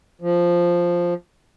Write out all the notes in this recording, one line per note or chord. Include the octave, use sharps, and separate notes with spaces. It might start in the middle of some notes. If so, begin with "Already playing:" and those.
F3